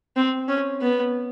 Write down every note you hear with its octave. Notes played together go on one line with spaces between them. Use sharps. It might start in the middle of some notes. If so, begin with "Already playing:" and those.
C4
C#4
B3